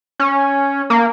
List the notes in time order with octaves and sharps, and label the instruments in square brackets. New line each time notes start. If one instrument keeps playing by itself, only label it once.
[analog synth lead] C#4
A#3